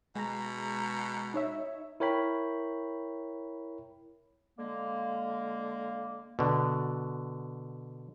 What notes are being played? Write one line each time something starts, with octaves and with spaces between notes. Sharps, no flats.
B2 G#3 A#5
D#4 C#5 E5
E4 A#4 C#5 G5 B5
D3 G#3 A#3
B2 D3